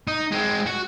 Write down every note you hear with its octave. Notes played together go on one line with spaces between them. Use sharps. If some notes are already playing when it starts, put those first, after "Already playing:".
D#4
G#3 C4
F#4